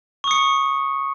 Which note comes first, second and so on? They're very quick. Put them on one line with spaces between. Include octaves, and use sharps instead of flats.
C#6 D#6 C#7